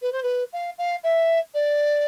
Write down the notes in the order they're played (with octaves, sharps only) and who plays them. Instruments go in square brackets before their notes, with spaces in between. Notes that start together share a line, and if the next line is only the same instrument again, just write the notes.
[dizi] B4
C5
B4
F5
F5
E5
D5